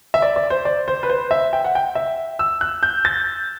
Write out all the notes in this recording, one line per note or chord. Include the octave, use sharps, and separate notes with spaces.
E5
D5
D5
C5
D5
C5
B4
C5
E5
G5
F#5
G5
E5
E6
F#6
G6
A6